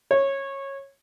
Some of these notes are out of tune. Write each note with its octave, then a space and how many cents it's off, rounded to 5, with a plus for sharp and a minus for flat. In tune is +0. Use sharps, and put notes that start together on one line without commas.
C#5 -15